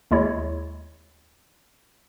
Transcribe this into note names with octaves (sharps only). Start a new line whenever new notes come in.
D#2 G#3 E4 C#5